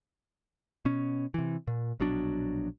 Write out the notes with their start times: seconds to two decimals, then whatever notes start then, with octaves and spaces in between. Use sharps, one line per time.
0.85 B2 C#4
1.34 C3 E3
1.68 A#2
2.00 A#1 B2 F#3 D4